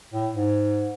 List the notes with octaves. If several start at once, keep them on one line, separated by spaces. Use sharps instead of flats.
A2
G#2